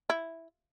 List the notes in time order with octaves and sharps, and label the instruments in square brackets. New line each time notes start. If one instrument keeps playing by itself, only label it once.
[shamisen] E4